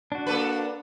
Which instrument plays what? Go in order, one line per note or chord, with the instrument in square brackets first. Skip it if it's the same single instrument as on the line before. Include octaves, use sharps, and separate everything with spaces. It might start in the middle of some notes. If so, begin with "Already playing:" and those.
[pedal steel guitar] D4 F#4
[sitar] A#3 A4 B4